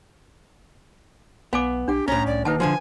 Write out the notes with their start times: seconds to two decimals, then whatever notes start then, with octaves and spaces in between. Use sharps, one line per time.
1.53 B1 B3 F5 G#5 D6
1.88 B1 D4 G4 F#5
2.08 C2 A2 C#4 A#5
2.27 C2 D5
2.45 E1 D#2 D#4 B4 F#5 A5
2.60 D3 E3 F3 G#5